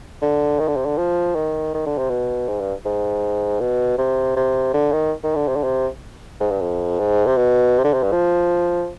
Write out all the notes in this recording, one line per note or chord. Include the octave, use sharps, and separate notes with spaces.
D3
D#3
D3
C3
D3
F3
D#3
D#3
D3
C3
B2
G#2
G2
G#2
B2
C3
C3
D3
D#3
D#3
D3
C3
D3
C3
G#2
G2
F2
G#2
C3
B2
C3
D3
C3
G2
F3